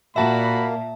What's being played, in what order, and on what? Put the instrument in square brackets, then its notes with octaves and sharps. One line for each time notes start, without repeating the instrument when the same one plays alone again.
[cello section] A#2 [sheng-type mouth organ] A#3 [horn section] F#4 B5 [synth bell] E5 A5